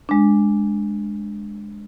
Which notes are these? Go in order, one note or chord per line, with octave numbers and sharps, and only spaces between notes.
G#3 D4